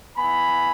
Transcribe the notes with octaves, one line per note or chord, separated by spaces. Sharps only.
B3 E4 G#5 B5